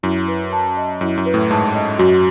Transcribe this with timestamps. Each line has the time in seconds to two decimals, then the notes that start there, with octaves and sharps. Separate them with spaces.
0.03 F#2 E4
0.28 B4
0.53 A5
0.77 D#5
1.01 F#2 E4
1.17 F#2
1.26 B4
1.34 A2
1.51 G#2 A5
1.75 D#5
1.99 F#2 F#4